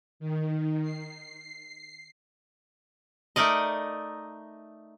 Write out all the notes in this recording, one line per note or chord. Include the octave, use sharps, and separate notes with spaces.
D#3
C7
A3 D#4 A#4 D5 D#5